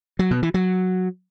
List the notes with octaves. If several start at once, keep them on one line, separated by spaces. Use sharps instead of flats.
F#3
B2
E3
F#3